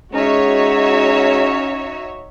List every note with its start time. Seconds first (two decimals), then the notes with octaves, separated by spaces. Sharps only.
0.13 G#3 C#4 D#4 F#4 C#5 E5